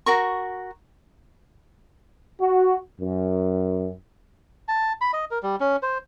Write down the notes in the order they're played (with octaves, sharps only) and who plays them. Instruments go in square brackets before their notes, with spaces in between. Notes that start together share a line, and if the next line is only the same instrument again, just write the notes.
[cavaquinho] F#4 A#4 C#6
[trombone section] F#4
F#2
[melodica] A5
B5
D#5
A#4
G3
C#4
C5